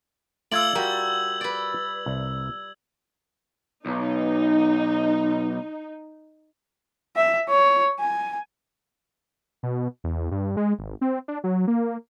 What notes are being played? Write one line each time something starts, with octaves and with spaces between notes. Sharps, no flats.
A3 F4 D5 F5 E6 G#6 F#7
G3 F#4 A#4
B4 D5
C2
B1 D#4
E5
C#5
G#5
B2
E2
G2
G#3
G#1
C4
D4
F#3
A#3